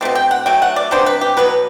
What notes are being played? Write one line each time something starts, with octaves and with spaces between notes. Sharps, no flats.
B2 A3 C4
G5
F#5
F#3 A3 G5
F#5
D5
C3 G3 B3 D4 C5
B4
G4
B2 F#3 B3 B4